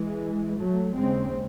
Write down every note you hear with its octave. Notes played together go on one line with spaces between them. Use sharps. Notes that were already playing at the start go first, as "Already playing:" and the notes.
Already playing: E3 G#3
F#3 A3
D#2 C#3 G#3 C4